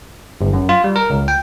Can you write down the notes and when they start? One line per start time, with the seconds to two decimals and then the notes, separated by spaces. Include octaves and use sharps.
0.41 G1
0.53 F#2
0.69 F4
0.84 G3
0.96 A#4
1.10 C#2
1.28 G5